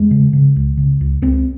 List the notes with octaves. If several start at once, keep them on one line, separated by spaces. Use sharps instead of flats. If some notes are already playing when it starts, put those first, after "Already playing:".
Already playing: E2 G#3
C#3
C#3
C#2
C#3
C#2
C#2 C4